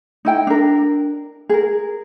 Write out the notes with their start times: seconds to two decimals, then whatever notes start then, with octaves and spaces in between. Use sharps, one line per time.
0.25 D#4 E4 G5
0.47 D4 A#4
1.49 G#4 A#4